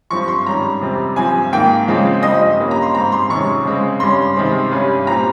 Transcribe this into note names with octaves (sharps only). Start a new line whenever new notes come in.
G2 F3 C4 C#6
C6
G#2 D#3 G3 C#4 A#5
F2 C3 G3 C4
G2 F3 C4 G#5
G#2 D#3 A#3 G5
C#3 F3 G#3 C4
G2 F3 C4 D#5
G2 G3 A#3 C#4
A#5
C6
G#2 G3 C4 A#5
C6
F2 C3 D#3 G#3 C#4 C#6
C#3 G#3 C4
G2 G3 C#4 C6
C3 D#3 G#3 C4
G2 G3 C#4
A#2 G3 C4 A#5